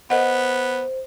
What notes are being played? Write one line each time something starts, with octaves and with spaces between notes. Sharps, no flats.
B3 A#4 C5 D#5 F#5